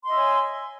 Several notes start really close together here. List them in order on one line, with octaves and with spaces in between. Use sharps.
C6 D#5 E5 C#5 G#5